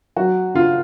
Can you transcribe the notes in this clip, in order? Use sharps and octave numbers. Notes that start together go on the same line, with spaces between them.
F#3 F#4
C#3 F4